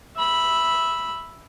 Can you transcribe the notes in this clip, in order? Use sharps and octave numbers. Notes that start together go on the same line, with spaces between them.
E5 B5